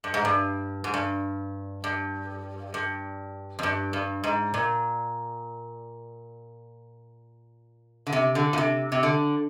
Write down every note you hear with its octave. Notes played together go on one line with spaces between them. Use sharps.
G2
G#2
G2
G#2
G2
G2
G2
F2
G2
G2
G#2
A#2
D3
C3
D3
A#2
C3
C3
D3